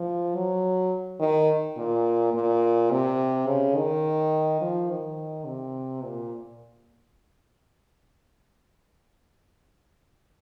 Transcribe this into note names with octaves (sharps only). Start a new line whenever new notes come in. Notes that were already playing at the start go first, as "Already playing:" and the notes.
Already playing: F3
F#3
D#3
A#2
A#2
C3
C#3
D#3
F3
D#3
C3
A#2